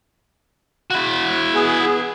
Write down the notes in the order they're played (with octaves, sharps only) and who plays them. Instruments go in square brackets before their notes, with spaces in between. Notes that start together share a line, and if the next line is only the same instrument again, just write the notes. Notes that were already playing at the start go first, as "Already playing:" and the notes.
[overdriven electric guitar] E4 F#4
[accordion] B3 G#4